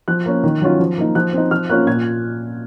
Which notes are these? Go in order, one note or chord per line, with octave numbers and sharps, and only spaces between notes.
F3 F#6
A#3 C#4
D#3
F#3 C#4 F4
F3
A#3 D#4
F3 F#6
C4 D#4
F3 F6
A#3 C#4 F4 F#6
A#2 G#6